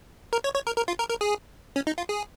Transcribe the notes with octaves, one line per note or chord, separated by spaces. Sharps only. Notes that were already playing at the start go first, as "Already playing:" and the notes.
A#4
C#5
C#5
A#4
A#4
F4
A#4
A#4
G#4
C#4
D#4
F4
G#4